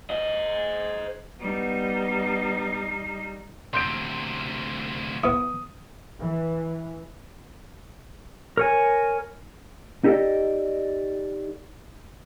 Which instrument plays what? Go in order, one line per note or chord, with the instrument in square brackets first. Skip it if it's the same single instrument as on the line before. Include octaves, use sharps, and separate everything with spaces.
[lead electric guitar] C5 D#5
[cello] G3 D#4 [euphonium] B3
[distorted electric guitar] D2 C3 [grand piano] C6 G6 D7
[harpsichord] B3 E4 [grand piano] D#6
[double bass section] E3
[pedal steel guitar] A#4 C#5 G#5
[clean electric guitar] D#4 G4 A4 D5 D#5